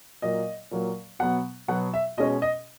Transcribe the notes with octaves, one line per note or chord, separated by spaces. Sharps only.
A#2 F#3 A#3 D#5
A#2 F#3 A#3
B2 F#3 B3 F#5
B2 F#3 B3 F#5
E5
B2 G#3 C#4 D#5
D#5